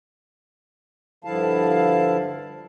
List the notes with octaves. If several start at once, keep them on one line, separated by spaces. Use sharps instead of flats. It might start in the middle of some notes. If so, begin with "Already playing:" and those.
G2 D3 F3 E4 F5 A5